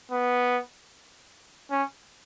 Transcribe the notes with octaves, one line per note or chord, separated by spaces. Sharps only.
B3
C#4